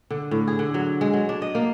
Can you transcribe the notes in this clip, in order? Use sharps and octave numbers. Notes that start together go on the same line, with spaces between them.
D3
A2
G#4
D3
F#3
G#3
F#3
D4
D#5
A#3